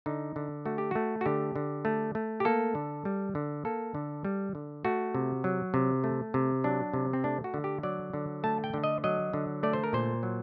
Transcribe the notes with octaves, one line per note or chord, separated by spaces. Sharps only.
D3 D#4
D3
A3 F#4
G4
A3 F#4
F#4
D3 G4
D3
A3
A3
G4
A#3 A4
D3
G3
D3
A#3 A4
D3
G3
D3
A3 F#4
C3
F#3
C3
A3
C3
F#3 D4
C3
C4
A3 D4
F#4
D3
G4
F#3 D5
D3
A3 A5
G5
D3
D#5
F#3 D#5
D3
A3 D5
C5
A#4
A#2 C5
F#3